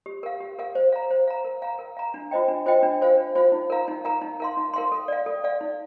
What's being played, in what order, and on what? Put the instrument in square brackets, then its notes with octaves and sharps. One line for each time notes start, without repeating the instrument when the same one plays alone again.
[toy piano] G4
A#4 F5
G4
A#4 F5
C5
F5 A#5
C5
F5 A#5
A#4
F5 A#5
A#4
F5 A#5
D4
F4 C5 D#5 G5
D4
F4 C5 D#5 G5
D4
F4 C5 F5
D4
F4 C5 F5
D#4
A#4 F5 A#5
D#4
A#4 F5 A#5
D#4
A#4 F5 C6
D#4
A#4 F5 C6
A4
D5 F5
A4
D5 F5
D#4